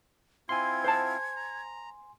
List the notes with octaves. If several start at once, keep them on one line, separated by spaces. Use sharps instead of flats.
C4 E4 F4 G#5 C6 G#6
C5 A5
A#5